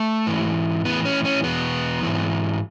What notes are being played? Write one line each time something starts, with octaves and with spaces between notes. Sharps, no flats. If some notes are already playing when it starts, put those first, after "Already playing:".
Already playing: A3
G#2 E3
A2 E3 B3
C#4
C#4
E2 B2 B3
G#2 E3